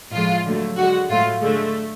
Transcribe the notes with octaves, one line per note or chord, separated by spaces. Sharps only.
A2 F3 G#3 F4
D3 F#3 A3
D3 G#3 F#4
A2 F#3 A3 F4
D3 G#3 A3